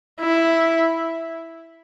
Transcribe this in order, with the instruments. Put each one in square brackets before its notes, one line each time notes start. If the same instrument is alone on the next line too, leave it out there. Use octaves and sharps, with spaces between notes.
[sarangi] E4